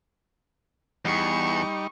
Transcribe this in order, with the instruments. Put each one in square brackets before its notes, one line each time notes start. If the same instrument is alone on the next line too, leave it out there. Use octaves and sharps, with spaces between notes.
[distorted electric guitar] E2 [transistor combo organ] G3 D#4 [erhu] C#6